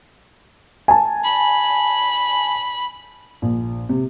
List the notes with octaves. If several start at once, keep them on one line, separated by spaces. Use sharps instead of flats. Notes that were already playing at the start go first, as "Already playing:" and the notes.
G#5 A5
B5
A#1
C3